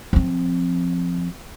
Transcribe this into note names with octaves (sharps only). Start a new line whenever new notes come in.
F3 C4